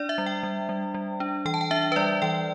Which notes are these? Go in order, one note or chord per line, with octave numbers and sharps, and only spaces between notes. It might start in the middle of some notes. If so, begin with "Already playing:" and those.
Already playing: D4 D5
E5
G3
G5
G3
G3
G3
D4
E3 G5
A5
G5
D4 E5
B4
G3 D5
E3 G5